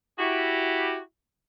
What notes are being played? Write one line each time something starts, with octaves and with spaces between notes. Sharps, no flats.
E4 F#4 G4